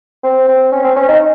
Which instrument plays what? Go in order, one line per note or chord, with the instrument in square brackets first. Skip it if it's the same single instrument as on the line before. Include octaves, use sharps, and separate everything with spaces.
[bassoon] C4
C4
C#4
C4
C#4
D#4